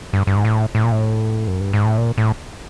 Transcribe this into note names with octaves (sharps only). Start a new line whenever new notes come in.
G2
G2
G#2
A2
A2
A#2
A2
F#2
G2
G#2
A2
A#2
A2